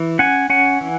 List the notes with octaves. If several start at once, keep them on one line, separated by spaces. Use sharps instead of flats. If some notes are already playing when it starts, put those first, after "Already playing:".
Already playing: E3
C#4 F#5 G#5
C#4 F#5 G#5
E3